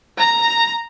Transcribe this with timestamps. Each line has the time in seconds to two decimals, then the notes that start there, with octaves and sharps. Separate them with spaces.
0.18 A#5